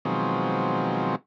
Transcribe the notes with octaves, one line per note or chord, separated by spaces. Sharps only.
B2 D#3 F3 F#3 G#3 C4